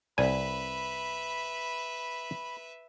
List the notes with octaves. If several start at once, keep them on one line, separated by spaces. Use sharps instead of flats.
C2 B4 D5 E5 G#5 B5